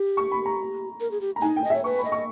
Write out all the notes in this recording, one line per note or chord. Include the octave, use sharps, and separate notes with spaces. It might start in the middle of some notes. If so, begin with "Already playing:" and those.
Already playing: G4
C#6
B5
A#5
A#4
G#4
G4
A#5
D#4 G#5
G5
D#5
C#5 E5
B4 C#6
B5
D#5
C#6